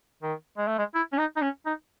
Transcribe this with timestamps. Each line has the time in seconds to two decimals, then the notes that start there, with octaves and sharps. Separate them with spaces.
0.23 D#3
0.58 G#3
0.68 A3
0.78 G#3
0.95 E4
1.12 C#4
1.18 D#4
1.37 D#4
1.42 C#4
1.66 D#4